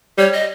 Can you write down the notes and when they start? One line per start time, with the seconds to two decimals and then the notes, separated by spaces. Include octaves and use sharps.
0.18 G3 C#5
0.33 D#5